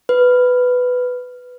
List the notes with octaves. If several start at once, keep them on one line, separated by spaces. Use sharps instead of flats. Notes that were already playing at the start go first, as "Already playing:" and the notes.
B4